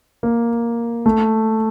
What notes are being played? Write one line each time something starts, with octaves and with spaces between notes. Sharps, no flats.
A#3
A3